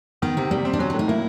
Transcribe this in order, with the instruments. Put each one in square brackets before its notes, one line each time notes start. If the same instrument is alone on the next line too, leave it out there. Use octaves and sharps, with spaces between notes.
[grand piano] D#3 [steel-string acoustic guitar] B3
[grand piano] C3 [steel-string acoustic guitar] C4
[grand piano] G3 [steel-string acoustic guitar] A#3
[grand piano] C4
[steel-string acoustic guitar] D4
[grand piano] F#3 [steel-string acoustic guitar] C#4
[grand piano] A2 [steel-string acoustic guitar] D4
[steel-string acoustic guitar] D#4
[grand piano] A#3 [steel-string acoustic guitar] E4